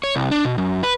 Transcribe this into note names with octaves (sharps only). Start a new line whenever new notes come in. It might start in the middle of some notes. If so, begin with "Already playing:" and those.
C#5
C2
D4
B2
F#2
B4